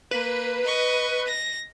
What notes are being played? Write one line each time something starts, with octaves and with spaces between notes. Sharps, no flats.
A#3 B4
D#5 C#6
A#6